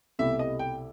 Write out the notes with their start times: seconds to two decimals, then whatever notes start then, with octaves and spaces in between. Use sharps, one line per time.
0.19 C2 B2 A3 E4 G4 E5
0.39 D#5
0.59 G5